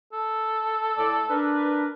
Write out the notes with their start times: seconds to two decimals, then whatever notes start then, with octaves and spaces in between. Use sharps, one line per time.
0.13 A4
0.97 A2 D5
1.30 D4 A#4 B4